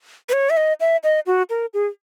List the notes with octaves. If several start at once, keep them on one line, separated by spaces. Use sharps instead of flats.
B4
C#5
E5
D#5
E5
D#5
F#4
A#4
G#4